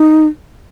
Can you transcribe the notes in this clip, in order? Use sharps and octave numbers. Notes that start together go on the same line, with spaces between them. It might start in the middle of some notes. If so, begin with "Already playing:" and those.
Already playing: D#4